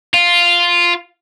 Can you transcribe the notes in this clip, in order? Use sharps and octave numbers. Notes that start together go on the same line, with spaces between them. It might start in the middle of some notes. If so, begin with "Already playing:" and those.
F4